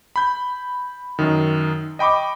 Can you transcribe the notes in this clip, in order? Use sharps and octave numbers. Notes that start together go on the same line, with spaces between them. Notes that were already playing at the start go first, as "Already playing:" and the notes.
B5 G6
F#2 D#3
D#5 G5 B5 C#6 D6